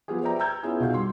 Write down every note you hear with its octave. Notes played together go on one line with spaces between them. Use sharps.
F3 B3 F4 G4 G#4
B4 C5 D5 E5 G5 A#5
A#5 E6 G6 G#6
B3 C#4 E4 F4 G#4
B1 B2 F#4 F5 G6
G3 C6